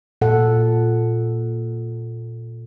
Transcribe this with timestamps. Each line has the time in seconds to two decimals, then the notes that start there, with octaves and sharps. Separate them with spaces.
0.21 A#2 A4 F#5